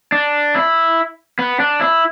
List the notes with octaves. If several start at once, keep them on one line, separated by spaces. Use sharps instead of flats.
D4
E4
B3
D4
E4